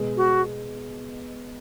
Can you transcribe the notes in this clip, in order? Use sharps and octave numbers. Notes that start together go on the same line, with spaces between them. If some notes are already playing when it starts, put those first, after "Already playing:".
Already playing: B2 G#3 B3
F#4